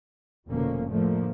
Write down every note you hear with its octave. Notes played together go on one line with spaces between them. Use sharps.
F1 B2 D3 F3 A#3 C#4
A2 D3 F3 A3 A#3